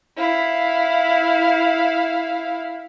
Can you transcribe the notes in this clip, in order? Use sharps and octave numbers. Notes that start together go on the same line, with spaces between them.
E4 F5